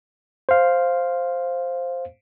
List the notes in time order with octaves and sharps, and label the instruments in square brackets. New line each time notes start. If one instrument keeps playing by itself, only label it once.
[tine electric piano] C5 F5